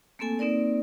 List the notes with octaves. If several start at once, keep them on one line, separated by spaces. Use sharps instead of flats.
A3 A#3 C4 A4 G#5
A#3 C4 D#4 A#4 D5